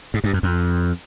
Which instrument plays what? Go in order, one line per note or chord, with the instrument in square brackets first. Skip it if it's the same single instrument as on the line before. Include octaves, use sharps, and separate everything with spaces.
[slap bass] G#2
G2
F#2
F2